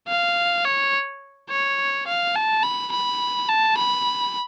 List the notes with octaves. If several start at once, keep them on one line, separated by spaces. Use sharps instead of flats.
F5
C#5
C#5
F5
A5
B5
B5
A5
B5